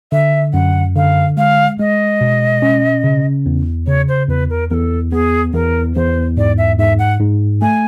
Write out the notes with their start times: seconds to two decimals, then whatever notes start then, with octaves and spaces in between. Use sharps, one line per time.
0.12 D3 E5
0.54 F#2 F#5
0.96 D3 F5
1.37 G#3 F5
1.79 G#3 D#5
2.21 B2
2.62 C#4
3.04 C#3
3.46 E2
3.87 C#3 C#5
4.08 C5
4.29 E2 B4
4.50 A#4
4.70 E2 A4 A#4
5.12 B3 G#4
5.53 E2 A#4
5.95 E2 C5
6.37 G#2 D5
6.58 E5
6.79 G#2 E5
6.99 F#5
7.20 G#2
7.62 A3 G#5